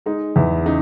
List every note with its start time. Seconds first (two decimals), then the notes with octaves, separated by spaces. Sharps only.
0.06 G#3 D#4
0.36 E2 E4
0.65 C#3 D#4